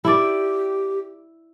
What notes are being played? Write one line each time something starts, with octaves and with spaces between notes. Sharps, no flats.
E4 G4 D5